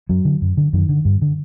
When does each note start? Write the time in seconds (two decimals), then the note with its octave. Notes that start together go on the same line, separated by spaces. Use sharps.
0.09 F#2 F#3
0.25 D3
0.42 F#2
0.57 D3
0.73 F#2 D#3
0.89 D3
1.05 G2
1.22 D3